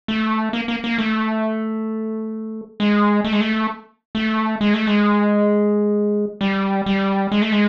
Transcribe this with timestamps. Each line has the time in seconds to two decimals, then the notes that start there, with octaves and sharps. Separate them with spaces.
0.08 A3
0.53 A#3
0.68 A#3
0.84 A#3
0.99 A3
2.80 G#3
3.25 A3
3.33 G#3
3.41 A3
4.15 A3
4.61 G#3
4.74 A3
4.87 G#3
6.41 G3
6.86 G3
7.32 G#3
7.42 A3
7.52 G#3